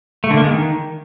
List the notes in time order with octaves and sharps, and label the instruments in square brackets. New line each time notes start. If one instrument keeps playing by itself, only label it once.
[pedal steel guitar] A3
D3
A#3
G#3
D#3